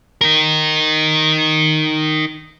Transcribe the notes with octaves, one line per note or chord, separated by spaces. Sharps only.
D#4 A#4